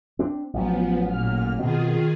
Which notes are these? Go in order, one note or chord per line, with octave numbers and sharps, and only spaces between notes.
C4 D4
A1 F3 F#3 B3
A#2 F6
B2 D#3 C4 F4 G#4